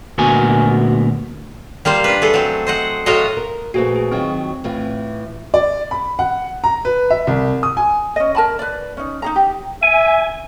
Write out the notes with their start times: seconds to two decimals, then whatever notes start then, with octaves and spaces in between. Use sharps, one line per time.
0.18 D2 A#2 B3 F#4 A#4 G#5
1.85 G3 A#3 F4 C5
2.04 D4 B4
2.22 A3 G#4 A4
2.34 F#3 C4
2.67 C5 D#5 F#5
3.06 A2 F#3 F4 F#4 C#5 D#5
3.37 A#4
3.74 A#2 F3 A3 F#4 G#4 B4
3.96 G#4
4.12 D#3 F#3 C4 F4
4.64 A2 E3 F4
5.54 D5
5.91 B5
6.19 F#5
6.64 A#5
6.85 B4
7.10 E5
7.27 C2
7.63 D#6
7.77 G#5
8.16 C#4 D#5
8.35 A#4 A5 B5
8.59 B4 D5
8.97 C#4 D#4
9.22 D#4 G#4 A#5
9.36 G4
9.83 E5 G#5